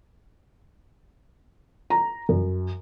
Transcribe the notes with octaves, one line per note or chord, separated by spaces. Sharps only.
A#5
F#2